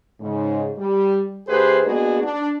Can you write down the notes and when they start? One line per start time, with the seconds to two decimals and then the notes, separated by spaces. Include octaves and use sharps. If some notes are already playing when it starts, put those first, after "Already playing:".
0.20 G#2 C#3
0.77 G3
1.47 D2 G4 G#4 B4 C5
1.84 G#3 A#3 B3 D4 F#4 G#4
2.22 D4